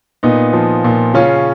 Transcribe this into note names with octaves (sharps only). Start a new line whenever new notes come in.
A#2 B3 D#4
F3
A#2
C#3 C#4 F4